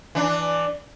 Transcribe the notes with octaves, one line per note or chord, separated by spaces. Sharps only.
E3 D4